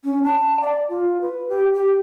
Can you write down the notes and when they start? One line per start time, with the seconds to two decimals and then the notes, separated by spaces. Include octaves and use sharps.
0.05 C#4
0.23 A5
0.61 D5
0.89 F4
1.21 B4
1.49 G4
1.74 G4